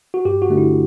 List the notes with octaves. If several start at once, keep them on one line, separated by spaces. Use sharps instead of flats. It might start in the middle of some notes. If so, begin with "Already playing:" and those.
F#4
G2 G4
F#4
D3 A3 D4
E4